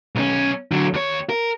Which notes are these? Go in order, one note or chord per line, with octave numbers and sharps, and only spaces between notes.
B1 C#4
D3 F#3
D#2 C#5
A#4